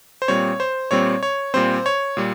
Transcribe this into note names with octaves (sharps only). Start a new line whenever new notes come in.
C5
A#2 G3 C4 C#5
C5
A#2 G3 C4 C#5
C#5
A#2 G3 C4 C5
C#5
A#2 G3